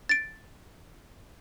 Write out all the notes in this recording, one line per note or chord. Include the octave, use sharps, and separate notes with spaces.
A6 D7